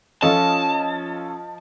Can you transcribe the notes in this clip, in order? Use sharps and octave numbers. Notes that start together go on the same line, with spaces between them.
F3 C#4 F4 A4 D#5 A5